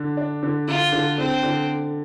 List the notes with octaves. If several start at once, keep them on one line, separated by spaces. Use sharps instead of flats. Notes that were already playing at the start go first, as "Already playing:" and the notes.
Already playing: D3 D4
D4
D3
D3 F4
D3
D3 C4
D3